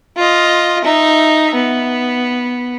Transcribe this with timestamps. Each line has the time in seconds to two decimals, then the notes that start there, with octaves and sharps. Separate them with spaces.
0.17 F4 D#5
0.85 D#4 E5
1.55 B3